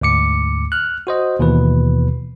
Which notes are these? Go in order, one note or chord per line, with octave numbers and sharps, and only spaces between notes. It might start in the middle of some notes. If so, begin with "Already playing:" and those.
D2 G#2 D6 C#7
F6 F#6
F#4 C5 D#5
D#2 B2 E3 B4